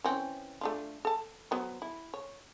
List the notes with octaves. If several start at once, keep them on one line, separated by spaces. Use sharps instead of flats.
E3 C4 C#4
A3 D4 F4
A4 A5
F#3 B3 C5
E4
C#5